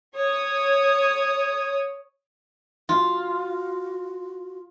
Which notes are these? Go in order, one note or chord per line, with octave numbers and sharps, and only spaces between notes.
C#5 D#6
F4 F#4